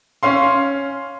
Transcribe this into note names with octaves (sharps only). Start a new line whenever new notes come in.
C#4 F5 C6